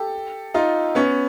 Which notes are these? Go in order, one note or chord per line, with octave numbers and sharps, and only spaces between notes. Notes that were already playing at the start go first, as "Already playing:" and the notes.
Already playing: G4 A4
D#4 F4
B3 C#4